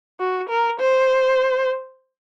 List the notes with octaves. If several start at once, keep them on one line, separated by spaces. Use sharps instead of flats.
F#4
A#4
C5